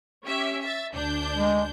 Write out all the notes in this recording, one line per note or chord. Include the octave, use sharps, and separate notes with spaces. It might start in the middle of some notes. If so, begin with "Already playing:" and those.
C#4 G4 E5
E5 A6
D2 D4 G6
G#3